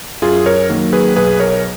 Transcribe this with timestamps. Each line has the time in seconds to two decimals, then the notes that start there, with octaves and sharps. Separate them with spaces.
0.22 F#2 F4 G#4
0.46 A#4 C#5
0.69 D#3 F#3 A#3
0.93 G#4 B4
1.16 B1 G#4 B4
1.40 A#4 C#5